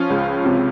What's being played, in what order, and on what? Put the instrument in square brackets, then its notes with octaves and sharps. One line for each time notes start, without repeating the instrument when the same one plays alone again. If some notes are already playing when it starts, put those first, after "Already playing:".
Already playing: [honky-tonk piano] F3 C#4 F4
C#2
C3